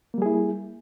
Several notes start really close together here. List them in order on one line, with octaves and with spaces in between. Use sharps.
A#3 G3 G#4 E4